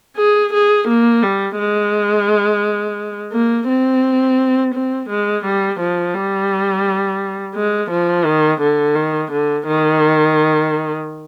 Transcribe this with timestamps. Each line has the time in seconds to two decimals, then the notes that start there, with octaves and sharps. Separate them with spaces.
0.17 G#4
0.53 G#4
0.88 A#3
1.23 G3
1.59 G#3
3.33 A#3
3.69 C4
4.74 C4
5.10 G#3
5.45 G3
5.80 F3
6.14 G3
7.55 G#3
7.90 F3
8.25 D#3
8.61 D3
8.95 D#3
9.31 D3
9.67 D#3